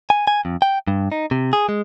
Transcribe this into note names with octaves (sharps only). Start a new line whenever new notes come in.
G#5
G#5
F2
G5
G2
D#4
C3
G#4
G#3